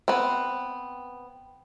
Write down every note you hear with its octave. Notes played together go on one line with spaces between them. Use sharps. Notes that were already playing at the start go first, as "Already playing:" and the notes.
B3 C4